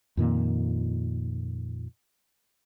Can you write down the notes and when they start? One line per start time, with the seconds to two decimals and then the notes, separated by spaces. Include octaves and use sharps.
0.17 F2 A#2 D#3 A#3